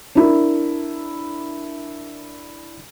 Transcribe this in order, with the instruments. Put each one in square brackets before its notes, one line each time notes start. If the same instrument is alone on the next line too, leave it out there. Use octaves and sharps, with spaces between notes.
[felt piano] D4 E4 A#4